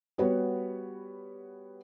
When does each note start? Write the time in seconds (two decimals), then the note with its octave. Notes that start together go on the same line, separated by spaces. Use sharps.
0.18 G3 B3 F#4 B4 C#5